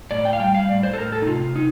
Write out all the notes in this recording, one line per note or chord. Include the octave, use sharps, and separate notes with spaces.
A2 D5
G5
F5
G3 G5
F5
A2 D5
C5
A4
A2 A#4
A4
D#4
C3 F4
C3 D#4